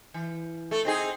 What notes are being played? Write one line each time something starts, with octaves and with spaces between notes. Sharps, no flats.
E3
A3 A4
C4 D#4 G#4